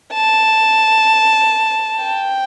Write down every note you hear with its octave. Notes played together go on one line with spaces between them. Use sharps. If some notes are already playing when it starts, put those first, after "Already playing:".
A5
G5